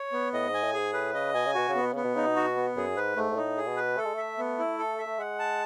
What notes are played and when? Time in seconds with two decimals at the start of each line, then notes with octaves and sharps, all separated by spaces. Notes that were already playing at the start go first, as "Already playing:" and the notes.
Already playing: C#5
0.12 B3
0.33 A2 D#5
0.49 G#2
0.54 G#5
0.63 A2
0.74 G#4
0.79 G#2
0.93 A2 B4
1.14 C#3 D#5
1.34 B2 G#5
1.46 C#3
1.54 B2 F#4
1.69 C#3
1.75 B3
1.81 B2
1.93 C#3 B3
2.04 B2
2.15 C#3 D#4
2.26 B2
2.36 F#4
2.56 B3
2.76 F#2 G#4
2.96 G#2 B4
3.16 G#2 A3
3.31 G#2
3.36 A2 D#4
3.57 G#4
3.67 B2
3.77 B4
3.97 A3 A4
4.05 G#3
4.14 A3 E5
4.38 B3
4.59 E4
4.78 A4
4.98 E5
5.07 A3
5.19 G#3 F#5
5.39 A5